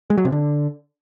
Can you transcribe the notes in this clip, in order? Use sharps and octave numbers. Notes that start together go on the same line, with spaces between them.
G#3
F#3
C3
D3